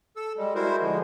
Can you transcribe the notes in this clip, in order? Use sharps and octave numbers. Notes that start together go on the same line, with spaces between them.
A4 E6
G3 G#3
G#3 E4 F#4 A#4 C5
D3 F3 G#3